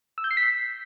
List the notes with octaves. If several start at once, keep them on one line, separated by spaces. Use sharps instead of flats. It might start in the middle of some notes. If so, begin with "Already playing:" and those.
E6
G6
C7
B6